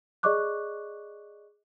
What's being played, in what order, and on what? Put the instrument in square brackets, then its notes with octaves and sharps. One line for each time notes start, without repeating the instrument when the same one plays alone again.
[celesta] G#4 D5 D#5 C#6 D6 F#6